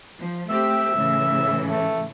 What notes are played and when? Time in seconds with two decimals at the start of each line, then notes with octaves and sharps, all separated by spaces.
0.19 F3
0.50 A3 C4 G4 E5
0.94 A2 C#3 E3
1.68 A3